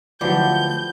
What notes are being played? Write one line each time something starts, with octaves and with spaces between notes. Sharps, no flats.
D2 F3 F#3 B3 E4 G4 D5 G6